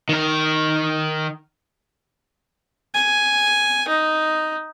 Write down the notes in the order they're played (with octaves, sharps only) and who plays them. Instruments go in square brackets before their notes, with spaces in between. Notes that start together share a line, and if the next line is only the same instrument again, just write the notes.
[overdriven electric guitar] D#3 A#4
[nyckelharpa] G#5
D#4